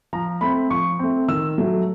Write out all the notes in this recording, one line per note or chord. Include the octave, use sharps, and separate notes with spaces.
F3 A#5
A3 C4 B5
F3 C#6
A3 C4
D#3 E6
F#3 A3